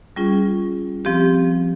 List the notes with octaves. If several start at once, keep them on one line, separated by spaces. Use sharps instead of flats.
G3 C#4 F4 G#4
F3 C4 G4